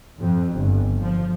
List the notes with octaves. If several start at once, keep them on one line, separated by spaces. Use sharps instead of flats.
F2
G1
F3